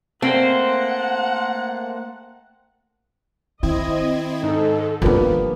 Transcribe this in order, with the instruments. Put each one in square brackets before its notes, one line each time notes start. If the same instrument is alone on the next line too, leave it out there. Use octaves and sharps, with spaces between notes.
[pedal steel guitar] A3 A#3 C5 [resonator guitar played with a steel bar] C4 [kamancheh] F#5
[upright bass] D#3 [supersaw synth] C4 E4 G#6 [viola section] D#5
[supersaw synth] G#2 [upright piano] D#4 [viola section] A4
[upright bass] D#3 D4 [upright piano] F3 A#3 B3 [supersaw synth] G3